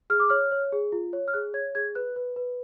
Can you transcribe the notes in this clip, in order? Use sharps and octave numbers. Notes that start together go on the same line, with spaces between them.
G#4 F6
D6
C#5 F6
C#5
G#4
F4
C#5
F6
G#4 F#6
C#5 G#6
G#4 G#6
B4 F#6
B4
B4